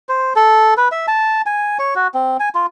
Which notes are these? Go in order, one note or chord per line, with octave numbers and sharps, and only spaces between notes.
C5
A4
B4
E5
A5
G#5
C#5
F#4
C4
G#5
F4